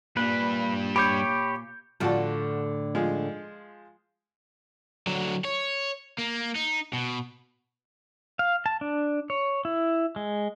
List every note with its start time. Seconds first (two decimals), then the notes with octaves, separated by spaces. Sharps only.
0.17 G2 A#2 G3 B4
0.96 G4 C#5 B5 D6 G6
2.00 A2 D3 F3 F#4 D5 A5
2.95 F3 G#3
5.07 D3 F#3
5.45 C#5
6.18 A#3
6.55 D#4
6.93 B2
8.39 F5
8.66 A5
8.81 D4
9.30 C#5
9.65 E4
10.16 G#3